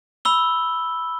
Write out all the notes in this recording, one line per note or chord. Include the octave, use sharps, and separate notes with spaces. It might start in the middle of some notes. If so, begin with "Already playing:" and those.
B5 E6 G7